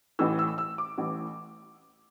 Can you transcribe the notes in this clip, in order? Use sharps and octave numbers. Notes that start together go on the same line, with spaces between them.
A1 A2 E3 E6
E6
E6
D6
A1 A2 E3